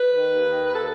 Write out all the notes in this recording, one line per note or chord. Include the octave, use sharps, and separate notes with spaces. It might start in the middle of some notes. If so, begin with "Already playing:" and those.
Already playing: B4
D#3
D#2
D#3
D#2 B4
A4